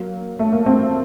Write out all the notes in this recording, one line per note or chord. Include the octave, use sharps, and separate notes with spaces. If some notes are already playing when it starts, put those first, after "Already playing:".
Already playing: F#3 A#3
A3
A#3
A3 C4